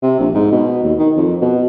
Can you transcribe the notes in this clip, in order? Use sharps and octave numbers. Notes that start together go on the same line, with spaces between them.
C3
A#1
G#2
B2
D#2
D#3
F2
B2